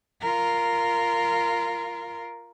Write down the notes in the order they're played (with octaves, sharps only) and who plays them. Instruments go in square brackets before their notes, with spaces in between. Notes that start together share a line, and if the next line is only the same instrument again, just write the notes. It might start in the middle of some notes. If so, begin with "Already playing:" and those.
[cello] F4 A#4